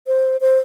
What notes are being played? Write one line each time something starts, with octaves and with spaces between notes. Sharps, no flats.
C5
C5